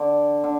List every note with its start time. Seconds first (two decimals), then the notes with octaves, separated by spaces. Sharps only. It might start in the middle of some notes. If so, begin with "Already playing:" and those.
Already playing: D3
0.44 D3